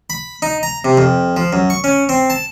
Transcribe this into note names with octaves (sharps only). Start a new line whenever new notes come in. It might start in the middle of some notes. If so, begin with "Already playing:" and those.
B5
D#4
A#5
C3
F2
F3
F#2
C#6
C#4
C4
A5